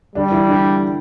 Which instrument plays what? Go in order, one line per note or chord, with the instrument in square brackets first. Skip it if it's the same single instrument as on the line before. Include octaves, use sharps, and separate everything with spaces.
[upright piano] D3 D4 [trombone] G3
[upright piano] E3 E4
D3 D4